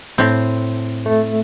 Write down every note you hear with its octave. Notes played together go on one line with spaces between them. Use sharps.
A2 C4
A3